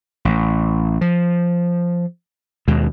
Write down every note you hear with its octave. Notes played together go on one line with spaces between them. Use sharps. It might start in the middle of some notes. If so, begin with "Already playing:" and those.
A1
F3
D#2 B2 G#3